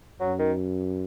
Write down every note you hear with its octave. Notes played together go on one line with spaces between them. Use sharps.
F#2 F#3
D#3